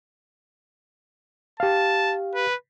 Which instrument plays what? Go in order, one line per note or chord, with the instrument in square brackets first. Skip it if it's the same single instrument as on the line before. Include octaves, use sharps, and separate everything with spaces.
[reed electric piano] G4 F5 [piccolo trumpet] A5
[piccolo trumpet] B4